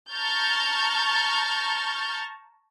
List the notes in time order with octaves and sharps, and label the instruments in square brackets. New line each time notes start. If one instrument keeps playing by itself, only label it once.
[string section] A5 A#5 C#6 F6 G6 A6